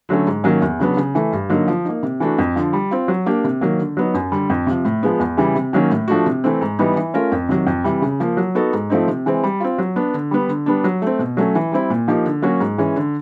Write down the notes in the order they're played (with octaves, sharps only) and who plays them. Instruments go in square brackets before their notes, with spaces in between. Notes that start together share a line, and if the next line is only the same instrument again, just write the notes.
[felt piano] D3 F#3 A3 C#4
G#2
D#3 F#3 A#3 C#4
E2
C#3 F#3 B3 D4
C#3
E3 A3
G2
D3 F#3 A#3 D#4
F3
A#3 D#4
C3
E3 A3 D4 F#4
F2
D3 F3
G3
C4 F4
F#3
A#3 D4 G4
C3
D#3 F#3 A#3
D3
F#3 B3 D#4
F#2
D3 G3
F2
C3 F3
A2
F3 G#3 B3
E2
C#3 E3 G3
C3
D#3 F#3 A#3 C#4
A2
F3 A3 D4 F#4
C3
E3 A3 C4
G#2
E3 G3 B3 D#4
E3
A3 C#4 F4 A#4
F2
C3 D#3 F#3
F2
C3 E3 G3
C#3
F3 A#3
F#3
B3 D#4 F#4 A4
G#2
F3 A3 C4 D#4
C3
E3 G#3 C4
G3
C4 F4
F#3
B3 D4
D3
G3 B3
D3
G3 B3 D4
F#3
A3 C4
B2
F#3 A3 C#4
E3
G3 C4 E4
A#2
F3 A#3 D#4 G4
D3
F#3 A#3 C#4 F#4
G#2
E3 G#3 C#4
D3